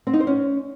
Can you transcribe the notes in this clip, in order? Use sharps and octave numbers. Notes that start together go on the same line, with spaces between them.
C4
D#4
C5
C#4